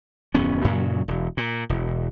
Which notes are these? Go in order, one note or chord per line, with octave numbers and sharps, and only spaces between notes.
D1 F2 B3 C#4
F#2 A#2 C#3 F#3
E1
A#2
E1